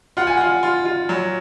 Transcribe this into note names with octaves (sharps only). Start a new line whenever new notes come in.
F4 F#5
G#5
F4 F#5
F4
F4
F#3